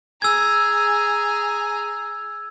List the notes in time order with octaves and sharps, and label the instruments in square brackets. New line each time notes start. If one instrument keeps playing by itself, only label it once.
[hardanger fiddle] G#4 A#5 [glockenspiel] E6 G#6